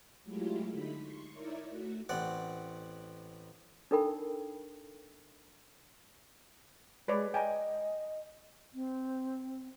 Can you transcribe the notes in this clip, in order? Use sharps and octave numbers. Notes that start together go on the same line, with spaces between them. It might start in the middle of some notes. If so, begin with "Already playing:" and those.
F#3 G#3 A3 E4 F4 G4
D3 D#4 B5 B6
C6 C#6
D#4 E4 A#4 C#5 D5 E5
A3 F#4 F#6
A1 C4 D5 F#5
D4 D#4 A4 A#4 G5 B5
G#3 B4 C#5 D5
D#5 G5 G#5 A#5
C4